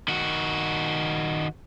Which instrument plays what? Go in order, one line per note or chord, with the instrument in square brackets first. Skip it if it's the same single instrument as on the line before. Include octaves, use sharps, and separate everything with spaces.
[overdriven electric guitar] D#3 F#4